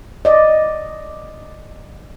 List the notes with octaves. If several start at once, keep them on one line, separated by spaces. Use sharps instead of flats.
D5 D#5